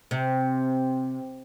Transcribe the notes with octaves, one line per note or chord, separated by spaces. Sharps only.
C3